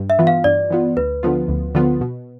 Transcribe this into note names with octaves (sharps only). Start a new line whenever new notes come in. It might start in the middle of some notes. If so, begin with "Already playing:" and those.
Already playing: G2
E5
E3 B3 F4
F5
G2 D5
E3 B3 F4
D2 B4
D3 F3 B3 F4
D2
D3 F3 B3 F4
B2